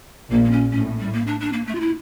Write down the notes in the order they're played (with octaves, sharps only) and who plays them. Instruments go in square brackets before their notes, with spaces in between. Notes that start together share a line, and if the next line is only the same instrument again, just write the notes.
[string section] A#1 A#2 [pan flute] A#3
[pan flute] A#3
C#4
[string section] A2 [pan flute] C#4
[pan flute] G3
A#3
D4
D4
A#3
A3
F4
E4